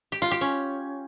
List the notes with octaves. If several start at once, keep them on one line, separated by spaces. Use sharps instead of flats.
G4
F4
G4
C#4